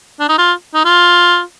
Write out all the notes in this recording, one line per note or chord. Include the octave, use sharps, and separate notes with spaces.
D4
D#4
F4
D#4
F4